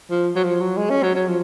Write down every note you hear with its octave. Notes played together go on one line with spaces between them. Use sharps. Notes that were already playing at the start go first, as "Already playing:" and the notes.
F3
F#3
F3
F#3
G#3
C#4
F#3
F#3
F3